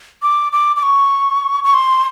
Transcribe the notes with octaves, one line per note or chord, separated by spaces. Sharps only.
D6
D6
D6
C#6
C#6
C6